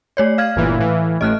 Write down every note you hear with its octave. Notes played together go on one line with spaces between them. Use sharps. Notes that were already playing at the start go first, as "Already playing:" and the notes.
A3 C#5 D5
F5 F6 G#6
G1 A#2 E3
A2 E3
A1 A2 D#5 F6 F#6